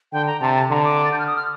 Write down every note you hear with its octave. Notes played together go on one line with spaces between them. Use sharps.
D3 G5
A#5
C3 A5
A5
D3 A#5
D6
A6
G6
F6
D#6
F6